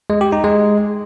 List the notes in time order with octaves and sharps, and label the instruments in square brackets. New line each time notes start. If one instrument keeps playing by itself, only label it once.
[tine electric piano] G#3
G4
D#4
G#3